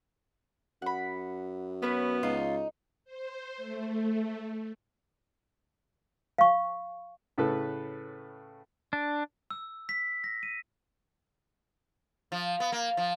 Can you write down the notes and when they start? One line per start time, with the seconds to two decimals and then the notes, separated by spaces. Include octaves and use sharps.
0.82 F#2 F#5 B5
1.82 B3 C#4 B4 C#5
2.23 C#2 D#4 F4
3.05 C5
3.57 A3
6.38 F5 C#6
7.38 A2 C#3 A4 B4
8.93 D4
9.51 E6
9.89 B6
10.24 A#6
10.43 D#7
12.32 F3
12.60 B3
12.72 A#3
12.97 F3